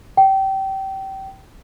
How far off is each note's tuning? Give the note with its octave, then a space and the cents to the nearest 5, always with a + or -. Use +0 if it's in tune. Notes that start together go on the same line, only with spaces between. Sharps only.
G5 -25